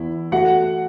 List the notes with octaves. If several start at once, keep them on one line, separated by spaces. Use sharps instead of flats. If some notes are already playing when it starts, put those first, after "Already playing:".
Already playing: E2 E4
A3 F#4 F#5